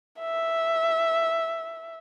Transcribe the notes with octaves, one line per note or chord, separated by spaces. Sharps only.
E5